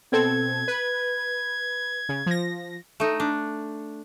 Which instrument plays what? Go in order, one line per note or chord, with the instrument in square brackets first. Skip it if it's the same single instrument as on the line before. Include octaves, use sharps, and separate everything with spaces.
[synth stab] B2 C4 A4 [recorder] G#6
[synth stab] B4
C#3
F3 A#6
[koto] A3 D#4
D4